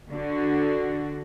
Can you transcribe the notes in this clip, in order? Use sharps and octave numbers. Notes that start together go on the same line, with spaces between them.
D3 F#4